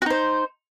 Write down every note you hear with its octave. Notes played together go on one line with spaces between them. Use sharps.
D#4 F#4 C5